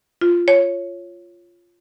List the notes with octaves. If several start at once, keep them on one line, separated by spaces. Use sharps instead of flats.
F4
C#5